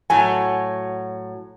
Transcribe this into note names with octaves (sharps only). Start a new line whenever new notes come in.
A2 F#3 G#5